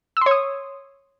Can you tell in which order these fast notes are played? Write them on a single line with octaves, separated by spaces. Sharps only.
E6 C6 C#5 D#6